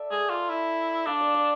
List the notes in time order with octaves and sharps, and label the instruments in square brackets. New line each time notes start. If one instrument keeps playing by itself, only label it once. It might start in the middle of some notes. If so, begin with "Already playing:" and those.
Already playing: [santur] A4 D5 E5
[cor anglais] G#4
F4
E4
[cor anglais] D4 [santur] F5
[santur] D5
D5